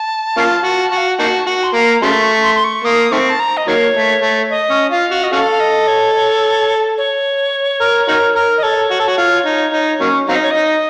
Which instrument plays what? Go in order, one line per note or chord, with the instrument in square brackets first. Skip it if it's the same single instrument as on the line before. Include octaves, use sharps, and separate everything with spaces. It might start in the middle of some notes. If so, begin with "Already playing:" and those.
Already playing: [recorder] A5
[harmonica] A#3 C#4 F4
F#4
F#4
[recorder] F5
F#5
[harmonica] A#3 D#4 F#4 [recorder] A5
[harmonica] F#4 [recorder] F#5
[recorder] C6
[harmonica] A#3 [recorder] A#5
[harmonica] C#3 F#3 A3 [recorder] C6
[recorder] C#6
C6
C6
C#6
[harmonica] A#3 [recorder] D#6
[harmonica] D#3 A3 C4 [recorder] C#6
[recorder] A5
A#5
D#5
[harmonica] D#3 F#3 A#3 [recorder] C#5
[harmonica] A3
A3
[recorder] D#5
[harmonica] C#4
[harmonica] F4 [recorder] F5
[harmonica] F#4
[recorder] D#5
[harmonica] C#4 F#4 A4 [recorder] F5
[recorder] F5
D#5
C#5
C#5
C#5
[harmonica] A#4
D#4 F#4 A#4
A#4
[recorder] D#5
[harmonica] A4 [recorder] C#5
[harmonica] F#4
A4
F#4
F4
D#4
D#4
F#3 A#3 C#4
[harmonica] F#3 C4 D#4 [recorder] F5
[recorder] D#5
C#5
[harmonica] D#4 [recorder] D#5